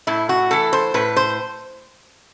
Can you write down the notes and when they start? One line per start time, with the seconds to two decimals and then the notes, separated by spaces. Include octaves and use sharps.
0.07 A2 E4
0.29 F#4
0.51 E3 A3 A4
0.73 C5
0.94 A2 B4
1.16 C5